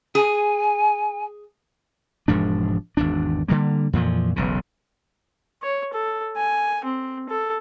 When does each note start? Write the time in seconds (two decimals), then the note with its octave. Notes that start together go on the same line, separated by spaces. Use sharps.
0.15 G#4 G#5
2.28 E1 G#2 F3 D4
2.97 G#1 E2 D4
3.48 D3 G3 A#3
3.93 F2 A#2 E3 F3
4.36 E1 B1 C#3
5.63 C#5
5.94 A4
6.37 G#5
6.85 C4
7.29 A4